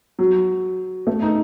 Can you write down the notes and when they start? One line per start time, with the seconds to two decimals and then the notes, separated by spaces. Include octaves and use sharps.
0.19 F#3
1.07 A3
1.22 D#4